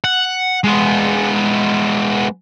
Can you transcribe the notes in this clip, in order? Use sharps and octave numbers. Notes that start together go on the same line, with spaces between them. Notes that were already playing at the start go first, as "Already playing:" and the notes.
F#5
G#3 B3